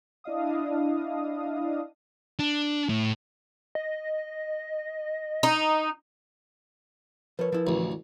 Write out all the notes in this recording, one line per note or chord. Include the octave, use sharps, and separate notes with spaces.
D4 E4 D#5 F5 D#6
D4
A2
D#5
D#4
F3 A#4 B4 C#5
F3 E4
A1 D2